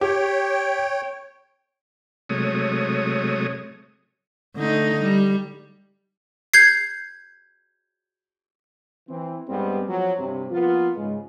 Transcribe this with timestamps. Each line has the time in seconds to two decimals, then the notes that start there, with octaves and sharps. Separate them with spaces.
0.01 G4 C#5 G5
2.29 C3 F#3 G#3 A3 C#5 D#6
4.56 D3 A3 D#4
5.02 G3
6.54 G6 G#6 C7
9.09 E3 C4
9.48 G2 G3 G#3 B3 C4
9.89 F3 F#3
10.19 G2 C3
10.50 F3 A#3 B3 F4
10.95 G#2 C#3 G#3